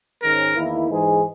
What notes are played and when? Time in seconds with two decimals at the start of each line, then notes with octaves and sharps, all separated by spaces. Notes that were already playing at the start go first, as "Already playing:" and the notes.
0.23 G#2 D#3 G#3 C#4 A#4
0.56 E2 D#3 A#3 E4
0.89 G#2 E3 G#3 D#4 G#4